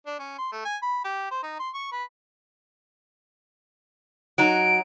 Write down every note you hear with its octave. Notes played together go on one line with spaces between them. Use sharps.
D4
C#4
C6
A3
G#5
B5
G4
C5
D#4
C6
C#6
B4
F#3 D#4 D7